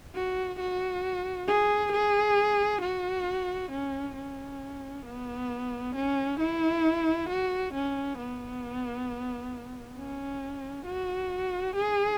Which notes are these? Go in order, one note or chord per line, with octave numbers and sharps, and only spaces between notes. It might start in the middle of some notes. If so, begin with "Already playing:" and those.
F#4
F#4
G#4
G#4
F#4
C#4
C#4
B3
C#4
E4
F#4
C#4
B3
C#4
F#4
G#4